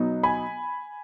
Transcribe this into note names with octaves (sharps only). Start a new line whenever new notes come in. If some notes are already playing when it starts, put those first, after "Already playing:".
Already playing: B2 F#3 B3 D#4
G#5 B5